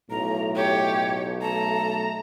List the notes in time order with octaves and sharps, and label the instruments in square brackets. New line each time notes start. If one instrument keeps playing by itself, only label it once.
[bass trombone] B1 [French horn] A2 [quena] A#5
[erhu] G4 [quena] C#5
[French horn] A3 [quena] A5 [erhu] A#5